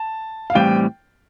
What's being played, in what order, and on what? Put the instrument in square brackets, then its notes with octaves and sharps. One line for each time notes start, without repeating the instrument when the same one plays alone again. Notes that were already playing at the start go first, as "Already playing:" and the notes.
Already playing: [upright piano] A5
F5
[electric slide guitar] A2 E3 G3 C4 [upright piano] G5